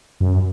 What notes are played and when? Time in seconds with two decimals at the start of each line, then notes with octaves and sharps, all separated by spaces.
0.20 F#2